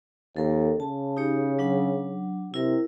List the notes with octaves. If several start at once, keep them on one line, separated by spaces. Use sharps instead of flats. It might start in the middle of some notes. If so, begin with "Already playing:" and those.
D#2 A4 A#4
C#3 A5
D#4 G4 C#5
F#3 D4 F#5
C3 E4 A#4